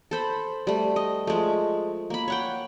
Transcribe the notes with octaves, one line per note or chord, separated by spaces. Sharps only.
A4 C5 B5
G3 A3
D#5
F3 G#3 A3
A#3 B5
C#5 F#5 G5